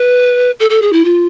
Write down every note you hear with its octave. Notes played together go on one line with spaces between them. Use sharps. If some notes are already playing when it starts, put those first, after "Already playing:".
Already playing: B4
A4
A4
G#4
E4
F4